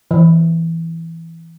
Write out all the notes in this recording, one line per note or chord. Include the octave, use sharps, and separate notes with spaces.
E3